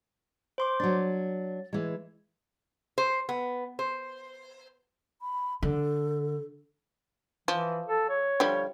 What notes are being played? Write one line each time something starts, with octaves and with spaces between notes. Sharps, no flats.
C5 C6 D6
F#3 D4 A6
E3 G#3
C5
B3
C5
B5
D3 A4
E3 F3
A4
C#5
D3 F3 G3